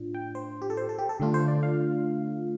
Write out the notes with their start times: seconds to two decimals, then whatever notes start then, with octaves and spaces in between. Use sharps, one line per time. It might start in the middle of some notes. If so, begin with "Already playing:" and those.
Already playing: A2 D4 F4
0.14 G5
0.35 C5
0.62 G4
0.70 A4
0.77 C5
0.89 A4
0.98 G4
1.09 A4
1.20 D3 A3 D4 F4
1.34 C5
1.48 D5
1.63 F5